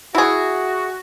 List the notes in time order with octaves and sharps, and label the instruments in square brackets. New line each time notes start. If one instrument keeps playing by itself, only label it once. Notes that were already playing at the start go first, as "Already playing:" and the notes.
[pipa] E4 G#4 [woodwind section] F#4